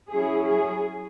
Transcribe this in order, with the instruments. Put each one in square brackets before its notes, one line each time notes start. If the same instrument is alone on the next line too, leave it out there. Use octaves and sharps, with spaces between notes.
[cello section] F#3 C#4 E4 G#4
G#4